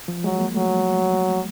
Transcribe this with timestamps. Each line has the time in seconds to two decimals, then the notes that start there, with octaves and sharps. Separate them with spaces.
0.08 F3
0.24 F#3 G#3
0.39 A#3
0.54 F#3 A3